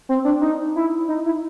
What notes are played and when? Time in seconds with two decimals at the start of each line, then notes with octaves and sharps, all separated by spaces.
0.09 C4
0.25 D4
0.41 D#4
0.76 E4
1.08 D#4
1.26 E4